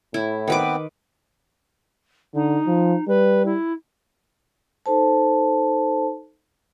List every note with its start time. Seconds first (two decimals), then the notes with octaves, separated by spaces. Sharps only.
0.14 A2 E4
0.48 D#3 B3 C4 B4 D6
2.34 D3 D#4
2.67 F3
3.08 G3 B4
3.45 E4
4.86 D#4 A4 C5 A5